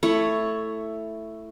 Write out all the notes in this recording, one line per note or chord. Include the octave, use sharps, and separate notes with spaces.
A3 E4 C#5